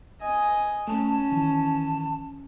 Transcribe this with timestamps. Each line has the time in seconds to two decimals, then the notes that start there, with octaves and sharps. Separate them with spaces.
0.21 D#5 G#5
0.88 A3 C#4 A5
1.32 D#3 E3